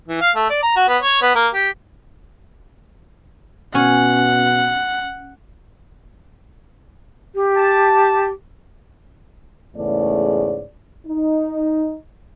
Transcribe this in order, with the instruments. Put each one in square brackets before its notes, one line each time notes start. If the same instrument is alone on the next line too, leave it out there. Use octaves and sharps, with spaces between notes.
[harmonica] E3
F5
A3
D5
A#5
F#4
B3
C#5
B3
A#3
G4
[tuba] B2 [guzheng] C#4 [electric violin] F#5
[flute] G4
[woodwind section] A5
[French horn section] E2 G#2 C#3 A3 D5
D#4